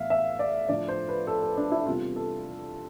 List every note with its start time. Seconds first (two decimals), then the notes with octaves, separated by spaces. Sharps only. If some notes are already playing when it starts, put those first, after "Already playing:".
Already playing: A2 E3 B3 E5 F5
0.10 E5
0.39 D5
0.69 A2 F3 A3 D4 D5
0.88 C5
1.08 B4
1.27 A4
1.42 A4
1.57 D4
1.72 E4
1.86 E2 C3 G3 C4 F4
2.16 A4